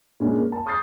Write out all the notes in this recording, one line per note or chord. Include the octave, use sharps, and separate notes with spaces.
A#2 G#3 C#4 D4 G#4
A#3
A5
C#6 D#6 G6 A6 C7